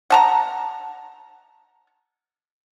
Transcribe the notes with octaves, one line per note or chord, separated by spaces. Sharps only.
F#5 A5 A#5